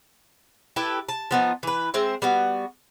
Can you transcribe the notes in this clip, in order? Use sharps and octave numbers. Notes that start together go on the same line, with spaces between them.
E4 G4 A4 B4
A5
F3 B3 D#4
E3 B4
G#3 C4 C5 E5
G3 B3 F#4